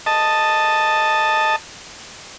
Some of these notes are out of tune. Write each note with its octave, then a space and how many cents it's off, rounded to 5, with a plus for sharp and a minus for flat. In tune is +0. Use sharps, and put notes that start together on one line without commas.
D#5 -5 A5 +0